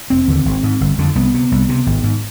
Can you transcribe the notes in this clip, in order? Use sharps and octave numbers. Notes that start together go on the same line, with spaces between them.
F1 C4
D#2 D3
G#1
G#2
G1
F2 D3
C2 B3
C3
C2
C3
G#1
G#2